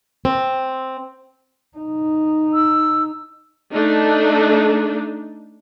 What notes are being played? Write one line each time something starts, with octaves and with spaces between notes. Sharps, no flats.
C4
D#4
E6
A3 D4 D#4